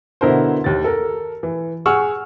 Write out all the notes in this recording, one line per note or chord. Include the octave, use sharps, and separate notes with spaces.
B2 D3 E4 A#4 C5
D#2 A6
A4 A#4
E3
G#4 F#5 G#5 C#6 E6 F6